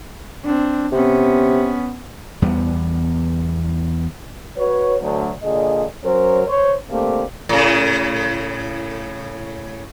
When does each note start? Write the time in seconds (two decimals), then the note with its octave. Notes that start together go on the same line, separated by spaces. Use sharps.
0.45 C4 D4
0.92 C3 B3 C#4
2.42 E2 G3 B3
4.57 F#4 B4 C#5
5.01 D2 F#3
5.43 A#2 D3 G#4 D#5
6.04 F#3 C#4 A#4 C5
6.47 C5 C#5
6.90 D3 A3 A#3 C4 G4
7.49 A2 C#3